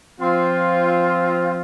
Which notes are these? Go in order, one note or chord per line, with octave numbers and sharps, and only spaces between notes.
F3 C4 F4